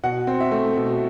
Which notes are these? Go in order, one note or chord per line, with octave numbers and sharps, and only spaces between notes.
B2 F#5
C4
E5
A3
B2